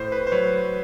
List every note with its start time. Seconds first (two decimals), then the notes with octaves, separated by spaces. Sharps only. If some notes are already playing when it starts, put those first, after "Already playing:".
Already playing: A2 C5
0.12 B4
0.27 C5
0.32 F#3 B4 C#5